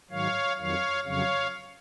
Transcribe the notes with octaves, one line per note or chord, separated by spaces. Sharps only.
G#2 D#3 F#3 C#5 F5
F2 D#3 F#3 C#5 F5
F2 C#3 F#3 C#5 F5